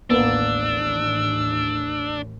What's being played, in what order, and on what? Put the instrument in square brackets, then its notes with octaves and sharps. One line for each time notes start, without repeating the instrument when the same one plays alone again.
[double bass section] A1 D#2 A2 [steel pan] A#3 B3 [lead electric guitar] D4 [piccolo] E6